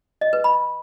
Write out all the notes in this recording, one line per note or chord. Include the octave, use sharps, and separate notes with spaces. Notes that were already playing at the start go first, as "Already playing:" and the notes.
D#5
B4
B5